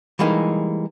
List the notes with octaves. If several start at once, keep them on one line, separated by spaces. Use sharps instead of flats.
E3 G3 G#3 A#3 D#4